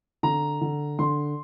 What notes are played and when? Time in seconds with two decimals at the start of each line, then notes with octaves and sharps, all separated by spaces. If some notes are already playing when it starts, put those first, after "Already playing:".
0.23 D3 A#5
0.61 D3
0.99 D3 C6